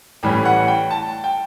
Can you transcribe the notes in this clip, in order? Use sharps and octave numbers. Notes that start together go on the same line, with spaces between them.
A1 A2 E3 G3 C#4 B5
F#5
G5
A5
G5